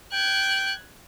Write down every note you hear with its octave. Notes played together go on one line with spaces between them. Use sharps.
G5 F#6 G#6